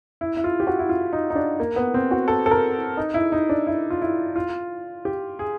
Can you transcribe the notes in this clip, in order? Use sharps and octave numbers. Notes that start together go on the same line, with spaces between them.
E4
E4
F4
G4
F#4
E4
F4
D#4
D#4
D4
A#3
B3
C4
F#4
A4
A4
A#4
D#4
E4
D#4
D4
E4
F4
E4
F4
G4
G#4